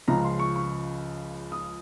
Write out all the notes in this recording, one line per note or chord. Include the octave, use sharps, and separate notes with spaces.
C#2 C#3 F3 A#5
C6
C#6
C#6
D#6